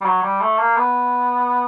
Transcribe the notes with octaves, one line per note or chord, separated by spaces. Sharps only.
G3
F#3
G3
A3
A#3
B3